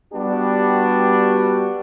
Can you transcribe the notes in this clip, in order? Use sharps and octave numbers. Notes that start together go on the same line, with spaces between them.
G3 B3 D4 F#4 G4